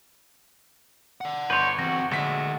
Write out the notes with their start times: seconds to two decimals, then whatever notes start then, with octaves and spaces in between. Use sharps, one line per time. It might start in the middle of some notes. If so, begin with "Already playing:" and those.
1.21 D5 F#5
1.50 G1 B4 C#5 C6 G6
1.79 E3 C4 F#4 A#6
2.11 A#1 D3 G#3 A3 F#4 B6